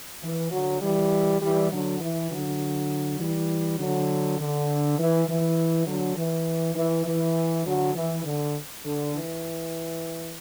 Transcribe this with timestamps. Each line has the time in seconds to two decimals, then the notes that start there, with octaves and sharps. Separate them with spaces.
0.23 E3
0.51 D3 F#3
0.81 E3 G3
1.41 E3 G3
1.71 D3 F#3
2.01 E3
2.30 D3 F#3
3.19 E3 G3
3.79 D3 F#3
4.39 D3
4.98 E3
5.27 E3
5.86 D3 F#3
6.17 E3
6.75 E3
7.06 E3
7.65 D3 F#3
7.95 E3
8.24 D3
8.84 D3
9.14 E3